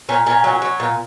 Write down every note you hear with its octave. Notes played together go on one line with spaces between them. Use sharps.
A#2 C#4
A#2 C#4
F#3
F#3
A#2